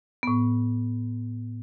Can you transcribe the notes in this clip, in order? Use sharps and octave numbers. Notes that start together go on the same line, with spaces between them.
A2 B3